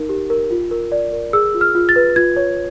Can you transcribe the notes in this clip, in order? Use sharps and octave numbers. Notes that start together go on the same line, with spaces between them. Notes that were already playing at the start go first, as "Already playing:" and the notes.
Already playing: D#4 A#4
G4
A#4
F4
A#4
D5
A#4
G#4 E6
F4
F6
F4
A6
B4
F4 G#6
C#5